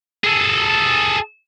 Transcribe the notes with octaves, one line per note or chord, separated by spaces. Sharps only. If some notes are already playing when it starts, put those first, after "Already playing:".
G#4 A4